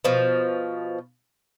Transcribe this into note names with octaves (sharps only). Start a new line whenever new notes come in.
B2 F3